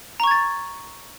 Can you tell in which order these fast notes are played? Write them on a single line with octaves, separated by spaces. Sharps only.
A#5 C#6 G#6 A6